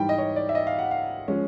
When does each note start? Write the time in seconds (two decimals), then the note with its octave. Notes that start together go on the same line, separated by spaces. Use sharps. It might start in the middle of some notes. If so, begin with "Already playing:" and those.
Already playing: G#2 E3 G3 G5
0.09 D#5
0.18 C#5
0.36 D5
0.49 E5
0.55 D#5
0.67 F5
0.79 F#5
0.91 F5
1.28 F3 G#3 C#4